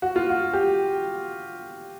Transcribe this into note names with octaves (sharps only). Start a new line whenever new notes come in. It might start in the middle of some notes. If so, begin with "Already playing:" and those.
F#4
F4
F#4
G4